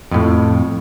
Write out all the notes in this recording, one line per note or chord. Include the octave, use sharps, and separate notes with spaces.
F2 A2